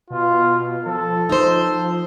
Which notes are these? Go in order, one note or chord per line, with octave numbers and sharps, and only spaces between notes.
B2 F4
F3 A4
D#4 C5